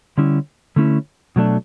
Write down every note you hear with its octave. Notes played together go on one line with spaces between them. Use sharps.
D3 G3 C#4 E4
D3 A3 C#4 E4
B2 F#3 A3 D4